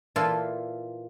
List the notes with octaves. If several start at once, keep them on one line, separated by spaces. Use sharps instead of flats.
A#2 E3 F4 A4 C6